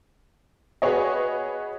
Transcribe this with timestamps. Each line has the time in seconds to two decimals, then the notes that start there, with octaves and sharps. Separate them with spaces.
0.82 F#4 G#4 B4 C#5 D#5